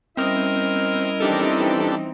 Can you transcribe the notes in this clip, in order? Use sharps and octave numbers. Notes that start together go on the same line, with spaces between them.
G3 C4 C#4 E4 A#4 D#5
E3 C4 D4 D#4 G4 A4